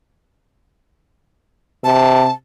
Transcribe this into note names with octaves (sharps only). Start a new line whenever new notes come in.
C3 A5